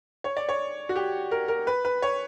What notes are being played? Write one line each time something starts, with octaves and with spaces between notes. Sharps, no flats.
C#5
D5
C#5
F#4
G4
A#4
A#4
B4
B4
C#5